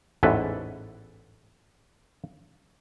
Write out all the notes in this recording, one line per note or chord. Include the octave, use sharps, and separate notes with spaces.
A1 E2 G#2 E4 A4 B4